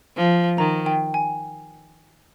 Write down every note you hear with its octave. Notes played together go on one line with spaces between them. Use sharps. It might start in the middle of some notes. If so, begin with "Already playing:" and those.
F3
D#3 A#5
G5
G#5